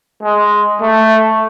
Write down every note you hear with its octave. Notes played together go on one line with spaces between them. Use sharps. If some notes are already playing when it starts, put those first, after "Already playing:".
G#3
A3